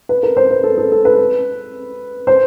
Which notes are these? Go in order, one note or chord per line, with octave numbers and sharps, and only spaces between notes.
B4
A#4
C5
B4
A4
A4
A4
B4
C5